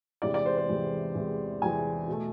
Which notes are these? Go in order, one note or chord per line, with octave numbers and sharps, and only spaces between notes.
E2 C3 E3 G#3 D5
D5
C5
C5
E2 C3 E3 G#3
E2 C3 E3 G#3
E2 C3 E3 G#3 G#5
B2 A3